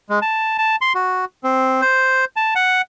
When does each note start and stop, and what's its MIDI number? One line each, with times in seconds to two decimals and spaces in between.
0.09 0.19 56
0.22 0.57 81
0.58 0.76 81
0.81 0.93 84
0.95 1.25 66
1.44 1.81 60
1.82 2.25 72
2.36 2.54 81
2.55 2.81 78